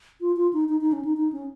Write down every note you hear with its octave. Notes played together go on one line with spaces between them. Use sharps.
F4
F4
D#4
D#4
D#4
C#4
D#4
D#4
C#4